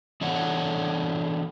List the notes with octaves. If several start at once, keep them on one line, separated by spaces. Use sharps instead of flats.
E3 B3 D4 A4 C#5 F#5